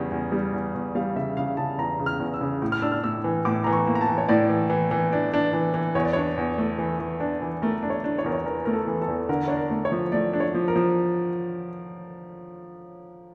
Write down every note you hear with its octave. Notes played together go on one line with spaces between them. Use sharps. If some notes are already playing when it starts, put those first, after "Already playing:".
Already playing: E2 C#3 G3
E2
G3
E2
E2
G3 F5
C#3 E5
C#3 F5
C#3 A5
E2 A#5
C#3
F6
E2
E6
C#3
A2
F6
D4 E6
F6
A2 E6
E3
A2 D6
E3 A#5
C#6
A#3
A#5
A5
E3
C#5
A2 D5
E3
E3
E3
D4
D4
E3
E3
E2 C#5
D5
D4 C#5
E2
A3
E3
E3
D4
E3
A3 A#4
D4
C#5
D4
C#5
E2 A#4
C#5
E3 A#4
A3 A#4
A4
E3
A4
E2
D3 A#4
D4 C#5
A#4
A3
C#5
F3
A3 D5
D4
C#5
F3
A#4
F3